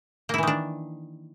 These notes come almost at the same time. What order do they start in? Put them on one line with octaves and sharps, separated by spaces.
A#3 E4 E3 D#3 D4